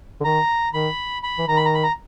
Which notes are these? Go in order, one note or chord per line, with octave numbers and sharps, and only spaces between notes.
D3
D#3 A#5
D#3 B5
B5
E3
D#3 A#5
B5
A#5
B5
A#5